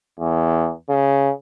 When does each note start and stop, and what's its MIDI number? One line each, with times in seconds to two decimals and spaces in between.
0.19 0.72 40
0.89 1.31 49